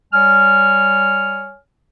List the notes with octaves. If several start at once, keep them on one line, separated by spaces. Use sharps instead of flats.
G3 C#5 G#5 F6